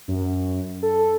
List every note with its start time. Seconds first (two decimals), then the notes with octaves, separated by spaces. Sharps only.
0.08 F#2
0.83 A4